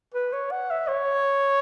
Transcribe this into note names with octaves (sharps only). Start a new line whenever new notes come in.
B4
C#5
F#5
E5
C#5